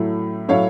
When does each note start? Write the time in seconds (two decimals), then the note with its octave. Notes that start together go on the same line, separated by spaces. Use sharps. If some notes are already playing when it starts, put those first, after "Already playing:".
Already playing: A2 F#3 A3
0.49 A2 F#3 A3 C#5 F5